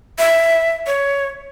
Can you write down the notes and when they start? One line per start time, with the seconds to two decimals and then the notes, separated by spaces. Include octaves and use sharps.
0.19 E5
0.87 C#5